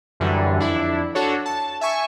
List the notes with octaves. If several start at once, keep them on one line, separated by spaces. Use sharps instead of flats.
F#2 D3 E3 F#3 G3
F2 D4 E4
D4 F#4 A4 C#5
A5
E5 G#5 C#6